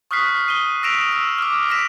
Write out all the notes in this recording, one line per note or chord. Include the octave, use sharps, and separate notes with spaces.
C#6 D#6 F6 F#6 B6 C7
D#7 G7
E6 A#6 B6 D7 E7 F7
E6
D6 F6
E6 A#6 B6 D7 E7